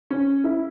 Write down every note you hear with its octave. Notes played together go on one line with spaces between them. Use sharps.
C#4
E4